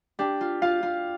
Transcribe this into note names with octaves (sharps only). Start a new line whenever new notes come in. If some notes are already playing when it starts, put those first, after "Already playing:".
D4 G4
F4
F4 F5
F4